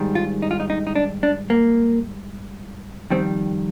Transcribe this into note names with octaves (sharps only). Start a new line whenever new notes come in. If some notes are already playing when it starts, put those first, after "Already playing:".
Already playing: G#2 D#3 G3
F4
D#4
F4
D#4
D#4
D#4
D4
D4
A#3
F2 D#3 G3 C4